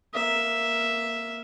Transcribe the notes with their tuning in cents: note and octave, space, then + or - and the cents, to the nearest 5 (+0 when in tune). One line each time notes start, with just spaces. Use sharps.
A#3 -5 E5 +0